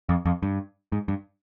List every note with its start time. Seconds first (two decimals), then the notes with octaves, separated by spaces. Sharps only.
0.09 F2
0.26 F2
0.43 G2
0.92 G#2
1.08 G2